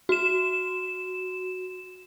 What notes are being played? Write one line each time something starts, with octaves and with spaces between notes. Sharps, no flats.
F#4 E7